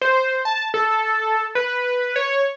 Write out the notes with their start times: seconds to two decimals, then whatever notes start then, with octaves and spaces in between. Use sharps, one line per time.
0.02 C5
0.45 A5
0.74 A4
1.55 B4
2.16 C#5